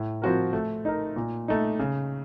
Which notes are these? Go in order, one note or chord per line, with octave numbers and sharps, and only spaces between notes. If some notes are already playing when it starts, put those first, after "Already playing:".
Already playing: A2
F3 C4 F#4 A#4
A3
D#4 A#4
A#2
A3 D#4
C#3